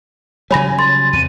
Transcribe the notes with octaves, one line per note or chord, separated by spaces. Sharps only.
C#3 F#3 G3 C#5 G#5 B5 A#6
C6 A6
E2 C3 D#7